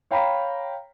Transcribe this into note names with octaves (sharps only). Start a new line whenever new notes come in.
C#5 F5 G5 A#5 B5